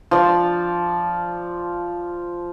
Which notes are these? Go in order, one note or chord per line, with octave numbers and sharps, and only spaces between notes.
F3 D5